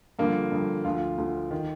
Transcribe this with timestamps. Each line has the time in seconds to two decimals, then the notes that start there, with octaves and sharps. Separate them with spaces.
0.19 G2 D3 F3 A#3
0.52 G2 D3 F3
0.85 D2 D3 F3 F4
1.18 D2 D3 F3
1.51 D#3